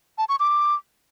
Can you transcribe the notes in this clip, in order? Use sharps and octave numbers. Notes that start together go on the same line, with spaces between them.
A5
C#6
D6